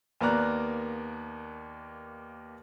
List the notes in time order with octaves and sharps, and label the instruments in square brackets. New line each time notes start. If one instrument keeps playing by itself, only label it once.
[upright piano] D#2 A#3 B3 D5 A#5 F#6